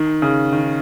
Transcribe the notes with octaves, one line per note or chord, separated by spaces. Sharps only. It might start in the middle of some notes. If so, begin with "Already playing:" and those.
Already playing: D#3
C#3
D#3